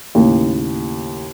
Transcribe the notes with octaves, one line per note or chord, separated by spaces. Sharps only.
D#2 A2 C#3